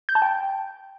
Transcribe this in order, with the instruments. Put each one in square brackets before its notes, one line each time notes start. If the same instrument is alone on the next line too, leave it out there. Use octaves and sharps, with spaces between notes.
[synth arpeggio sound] G6
A5
G5